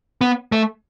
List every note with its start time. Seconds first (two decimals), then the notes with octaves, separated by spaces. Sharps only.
0.21 B3
0.52 A3